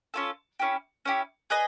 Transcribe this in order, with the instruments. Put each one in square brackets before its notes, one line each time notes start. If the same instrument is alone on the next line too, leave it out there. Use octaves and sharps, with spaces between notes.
[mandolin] C#4 F4 A4
C#4 E4 G4
C#4 E4 G4
G#4 B4 D#5